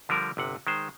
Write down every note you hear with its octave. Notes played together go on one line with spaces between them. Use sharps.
D3 F3 G3 A#4
G1 C3 F#5
D#3 G#3 C5